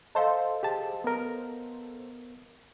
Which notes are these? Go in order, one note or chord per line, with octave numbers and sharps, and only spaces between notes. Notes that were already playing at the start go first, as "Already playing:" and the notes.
A4 C5 D#5 F5
G4 G#4 A5
B3 A#4